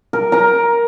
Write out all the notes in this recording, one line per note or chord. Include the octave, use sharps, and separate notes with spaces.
A#4
A#4 A#5